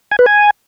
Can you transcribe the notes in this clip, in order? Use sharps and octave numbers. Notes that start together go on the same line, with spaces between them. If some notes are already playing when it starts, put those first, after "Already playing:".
G#5
B4
G#5